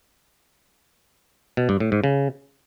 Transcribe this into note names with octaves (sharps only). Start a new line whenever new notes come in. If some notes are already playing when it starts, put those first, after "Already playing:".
B2
G2
A2
G#2
C#3